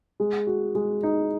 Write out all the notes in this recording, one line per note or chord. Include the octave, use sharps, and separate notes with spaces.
G#3
F#4
G#3
D#4